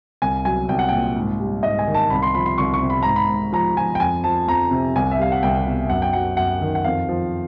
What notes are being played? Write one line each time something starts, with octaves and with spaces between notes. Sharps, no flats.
C2 G#5
F#3 G#5
C2 G5
F#5
A#2 G5
G#2
G3
G#2 D#5
G#5
D#3
A5
C2 B5
C6
F3 B5
C6
C2 C#6
C#6
C3
B5
G#2 A#5
B5
G#2
F3 A#5
F3 G#5
G5
F2 G#5
F3 A5
F2 A#5
C3
C2 G#5
E5
G3 F5
F#5
C2 G5
B2
F#2 F#5
G5
F#3 F#5
F#2 F#5
D#3
F#5
F2 F5
F3